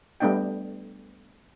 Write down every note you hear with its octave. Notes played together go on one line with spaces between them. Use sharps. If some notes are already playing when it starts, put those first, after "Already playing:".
G3 A3 B3 D4 D#5 G5